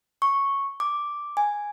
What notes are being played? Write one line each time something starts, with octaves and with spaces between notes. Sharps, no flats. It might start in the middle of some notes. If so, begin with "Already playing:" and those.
C#6
D6
G#5